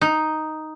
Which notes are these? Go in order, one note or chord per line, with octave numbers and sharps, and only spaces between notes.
D#4